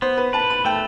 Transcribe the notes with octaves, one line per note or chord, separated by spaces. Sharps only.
B3 C5
B4
B4 A5
B5
A3 G5